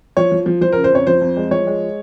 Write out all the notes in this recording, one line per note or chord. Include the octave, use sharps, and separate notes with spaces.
F3 C#5
F3
F3
F3 C5
C#3 A#4
C5
F2 C#5
F3 C5
F2
G#3
F3 C#5
G#3